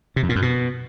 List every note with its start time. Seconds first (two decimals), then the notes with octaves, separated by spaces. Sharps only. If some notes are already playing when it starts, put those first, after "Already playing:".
0.16 C3
0.23 F2
0.29 A#2
0.36 F#2
0.42 B2